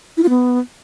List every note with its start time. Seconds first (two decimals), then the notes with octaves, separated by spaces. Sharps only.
0.17 E4
0.23 F4
0.29 B3